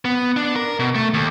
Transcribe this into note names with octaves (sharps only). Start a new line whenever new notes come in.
B3
D4
A#4
B2
A3
D#2